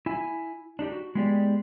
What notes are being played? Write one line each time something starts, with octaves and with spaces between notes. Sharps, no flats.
E4 G#5
D4 D#4 G4
F#4
G#3 B3 D#4 G4 G#4 D5